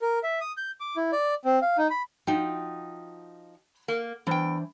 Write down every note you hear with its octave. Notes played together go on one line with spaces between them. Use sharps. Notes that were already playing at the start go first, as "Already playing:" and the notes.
A#4
E5
D#6
G6
D6
E4
D5
C4
F5
D#4
B5
F3 D#4 F#4 G5
A#3
E2 E3 D4 C5 G5